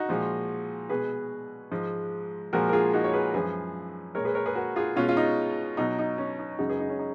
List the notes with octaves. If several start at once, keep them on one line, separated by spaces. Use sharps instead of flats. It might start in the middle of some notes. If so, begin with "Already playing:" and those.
Already playing: D#4 F#4
A#2 F3 G#3
B2 G#3 G#4 B4
G#2 F3 G#3
A#2 F3 G#3 F#4 A#4
A#4
F4 G#4
D#4 F#4
C#5
G#4 B4
F#2 F3 G#3 G#4 B4
A#2 G#3 A#4 C#5
G#4 B4
A#4 C#5
G#4 B4
F#4 A#4
F4 G#4
B2 G#3 C#4 F4
F4
D#4
B2 F#3 D#4
D#4
C#4
D#4
F#2 C#3 G#3 D#4 F#4
G#4 B4
D#4
C#4
D#4